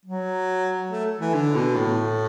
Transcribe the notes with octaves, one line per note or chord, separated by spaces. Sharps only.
F#3
A3
E3
D3
B2
A2